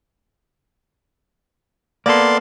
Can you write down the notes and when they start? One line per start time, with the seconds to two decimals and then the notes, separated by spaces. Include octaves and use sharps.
2.06 A#3 B3 A4 D5 C6